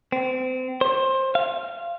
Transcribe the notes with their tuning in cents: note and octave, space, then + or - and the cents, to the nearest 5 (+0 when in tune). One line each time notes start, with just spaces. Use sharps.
C4 -30
C5 +20
F5 -20